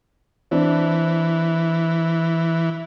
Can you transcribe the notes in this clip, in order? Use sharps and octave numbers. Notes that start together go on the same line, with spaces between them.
E3 C4 D4